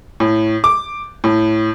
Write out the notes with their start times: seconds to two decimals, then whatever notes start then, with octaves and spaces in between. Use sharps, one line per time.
0.20 A2
0.64 D6
1.24 A2